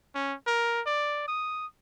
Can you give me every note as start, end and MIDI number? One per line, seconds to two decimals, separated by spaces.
0.15 0.34 61
0.47 0.81 70
0.86 1.26 74
1.28 1.67 87